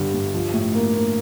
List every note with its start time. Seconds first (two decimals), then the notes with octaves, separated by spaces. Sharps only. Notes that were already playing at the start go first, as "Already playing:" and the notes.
Already playing: G1 G2 D3
0.14 G2
0.34 F3
0.54 A2
0.74 A#3
0.94 A#3